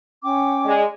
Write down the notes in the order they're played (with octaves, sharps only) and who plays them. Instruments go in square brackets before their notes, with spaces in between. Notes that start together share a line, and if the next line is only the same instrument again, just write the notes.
[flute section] C#4 G5 D6
[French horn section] G#3 D5